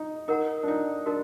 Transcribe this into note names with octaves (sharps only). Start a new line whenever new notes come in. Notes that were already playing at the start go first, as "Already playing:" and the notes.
Already playing: D#4
D#4 A#4 F#5 A#5
D4
D#4
D4 F#4 A#4 D#5 A5